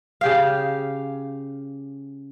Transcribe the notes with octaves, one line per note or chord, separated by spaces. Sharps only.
C#3 G4 F5